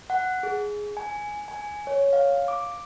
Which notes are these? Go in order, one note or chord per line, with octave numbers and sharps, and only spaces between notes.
F#5
G#4
G#5
G#5
C#5
F5
D6